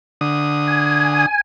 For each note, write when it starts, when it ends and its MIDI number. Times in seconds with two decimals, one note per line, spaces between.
0.21 1.26 50
0.21 1.26 87
0.67 1.41 80